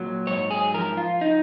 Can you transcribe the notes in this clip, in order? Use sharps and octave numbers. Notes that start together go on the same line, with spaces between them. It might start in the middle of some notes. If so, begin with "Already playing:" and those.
Already playing: A#2 F#3
G#2 C#5
G#4
F3 A#4
F4
D#4